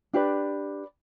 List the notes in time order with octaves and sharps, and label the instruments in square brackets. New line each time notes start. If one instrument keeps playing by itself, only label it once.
[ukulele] D4 G4 B4 D5